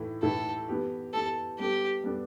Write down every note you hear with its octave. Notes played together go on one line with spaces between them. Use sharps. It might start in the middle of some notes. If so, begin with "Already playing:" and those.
Already playing: A2 E3 A3 E4
A2 E3 A3 E4 A4
E3 B3 G4
E3 B3 G4 A4
G3 B3 D4 G4 A4
G3 B3 D4 A4